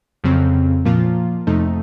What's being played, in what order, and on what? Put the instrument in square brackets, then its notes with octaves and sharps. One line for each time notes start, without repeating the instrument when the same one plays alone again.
[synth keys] F2 C#3 F#3 C4
A#2 F3 A#3 F4
F2 C3 F3 A3 D#4